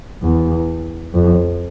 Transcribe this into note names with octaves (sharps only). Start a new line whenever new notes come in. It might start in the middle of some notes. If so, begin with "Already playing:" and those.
E2
F2